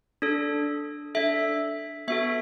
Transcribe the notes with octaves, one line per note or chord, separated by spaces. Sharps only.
D4 A4
D4 A4 E5
B3 F#4 A4 E5